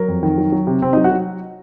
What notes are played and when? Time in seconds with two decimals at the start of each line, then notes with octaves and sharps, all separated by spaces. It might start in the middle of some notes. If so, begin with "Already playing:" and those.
Already playing: F#3 A#4
0.08 F2
0.23 D#3
0.38 F#3
0.52 F#3
0.67 C3
0.82 C3 C4 C5
0.93 F#3 D#4 D#5
1.04 F#4 F#5
1.12 F#3